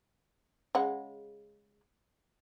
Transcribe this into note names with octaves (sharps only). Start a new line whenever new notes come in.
C#3 G#3 F#5